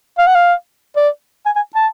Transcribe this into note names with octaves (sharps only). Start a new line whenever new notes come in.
F5
F#5
F5
D5
G#5
G#5
A5